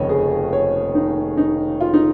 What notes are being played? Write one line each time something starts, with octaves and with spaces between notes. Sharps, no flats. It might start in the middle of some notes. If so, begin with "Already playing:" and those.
Already playing: F1 D#2 C#3 F3 C#5 D#5
G#4
C#5
D#4
D#4
F4
D#4